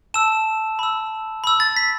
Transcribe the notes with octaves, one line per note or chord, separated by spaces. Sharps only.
A5 E6 E7
B5 E6
B5 E6
A6
B6